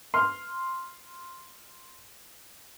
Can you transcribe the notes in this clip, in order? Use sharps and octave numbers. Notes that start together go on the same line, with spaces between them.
C6 F6